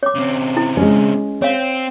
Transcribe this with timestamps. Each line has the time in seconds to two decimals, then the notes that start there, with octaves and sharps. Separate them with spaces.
0.03 C#5 D6
0.15 C#3 C4
0.57 E4
0.77 G#3 C#4
1.42 C4 C#5 F5